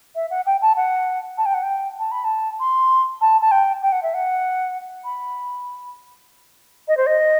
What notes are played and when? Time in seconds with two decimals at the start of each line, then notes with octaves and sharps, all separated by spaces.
0.15 E5
0.30 F#5
0.46 G5
0.62 A5
0.77 F#5
1.38 A5
1.46 G5
1.54 F#5
1.63 G5
1.99 A5
2.11 B5
2.24 A5
2.60 C6
3.21 A5
3.41 A5
3.51 G5
3.82 G5
3.92 F#5
4.03 E5
4.14 F#5
5.04 B5
6.88 D#5
6.97 C5
7.06 D#5